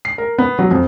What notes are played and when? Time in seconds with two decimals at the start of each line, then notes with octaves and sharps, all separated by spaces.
0.05 C7
0.18 A#4
0.38 B3
0.59 F#3
0.71 F2